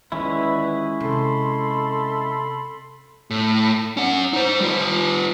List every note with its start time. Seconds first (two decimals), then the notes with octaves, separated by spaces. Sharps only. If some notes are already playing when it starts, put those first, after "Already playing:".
0.12 A#2 D3 D#3 G#3 C#4 E4 B4
1.00 C3 A4 B5 C6
3.30 A2
3.97 C#4 F#5
4.33 D#4 C5
4.60 G3 F4